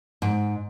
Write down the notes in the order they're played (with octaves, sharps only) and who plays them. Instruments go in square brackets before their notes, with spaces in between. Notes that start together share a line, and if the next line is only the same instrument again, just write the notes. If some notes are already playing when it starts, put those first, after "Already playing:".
[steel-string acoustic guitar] G#2